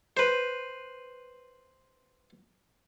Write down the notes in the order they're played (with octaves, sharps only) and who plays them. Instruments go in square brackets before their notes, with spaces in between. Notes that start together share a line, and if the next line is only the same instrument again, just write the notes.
[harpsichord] B4 C5